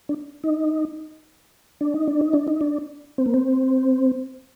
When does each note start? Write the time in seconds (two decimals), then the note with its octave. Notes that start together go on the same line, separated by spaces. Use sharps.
0.09 D4
0.44 D#4
1.81 D4
1.94 D#4
2.08 D4
2.21 D#4
2.33 D4
2.48 D#4
2.61 D4
3.18 C4
3.26 A#3
3.34 C4